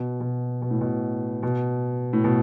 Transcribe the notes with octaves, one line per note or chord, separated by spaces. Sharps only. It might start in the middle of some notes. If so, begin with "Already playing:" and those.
Already playing: B2
B2
B2
A2
B2
B2
A2
B2